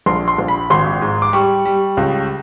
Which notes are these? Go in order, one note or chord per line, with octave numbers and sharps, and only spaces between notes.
A#1 C6
C6
A#1
B5
G#1 C6
G#2
D6
G3 C#6
G3
C#2